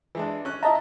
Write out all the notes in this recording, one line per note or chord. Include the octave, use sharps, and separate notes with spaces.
E3 G#3 D4
C#4 F#6
E4 D#5 E5 A5 A#5